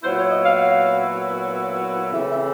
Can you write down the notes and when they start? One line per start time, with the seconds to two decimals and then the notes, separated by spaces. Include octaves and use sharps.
0.03 A#2 F#3 B3 E4 C5
0.16 C#5
0.29 D#5
0.42 F5
0.56 F5
2.11 C#3 E3 A3 C4 E5
2.29 E5